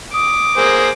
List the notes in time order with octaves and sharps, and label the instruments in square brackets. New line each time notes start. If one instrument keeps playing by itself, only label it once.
[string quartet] D6 [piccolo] D#6
[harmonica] A#3 G#4 C5